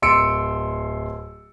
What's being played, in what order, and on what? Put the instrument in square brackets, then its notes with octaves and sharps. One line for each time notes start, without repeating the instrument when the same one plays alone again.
[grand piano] D1 C6 E6 C#7 D7